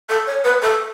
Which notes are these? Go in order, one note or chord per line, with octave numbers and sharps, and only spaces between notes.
A4
C#5
B4
A4